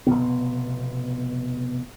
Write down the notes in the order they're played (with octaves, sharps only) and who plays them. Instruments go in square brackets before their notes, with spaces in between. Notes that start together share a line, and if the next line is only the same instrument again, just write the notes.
[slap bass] F1 G#2 B2 B3